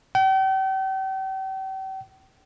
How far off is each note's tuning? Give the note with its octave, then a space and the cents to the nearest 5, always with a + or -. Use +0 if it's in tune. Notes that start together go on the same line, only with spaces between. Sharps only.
G5 -40